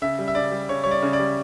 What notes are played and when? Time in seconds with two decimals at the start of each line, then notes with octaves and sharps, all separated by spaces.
0.02 C#3 E5
0.19 G3
0.28 E5
0.35 C#3 D5
0.52 G3
0.69 C#3 C#5
0.84 G3 C#5
0.91 D5
1.02 C#3
1.13 D5
1.20 G3